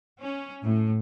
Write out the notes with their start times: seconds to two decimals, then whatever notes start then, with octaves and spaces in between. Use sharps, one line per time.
0.20 C#4
0.63 A2